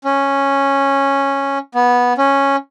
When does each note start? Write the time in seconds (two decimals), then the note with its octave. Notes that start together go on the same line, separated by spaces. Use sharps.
0.04 C#4
1.75 B3
2.18 C#4